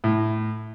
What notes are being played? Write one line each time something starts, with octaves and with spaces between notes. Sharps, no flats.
A2